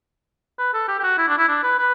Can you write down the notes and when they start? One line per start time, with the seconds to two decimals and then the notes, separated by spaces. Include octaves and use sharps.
0.58 B4
0.74 A4
0.88 G4
0.99 G4
1.03 F#4
1.18 E4
1.28 D4
1.38 E4
1.48 D4
1.64 B4
1.79 B4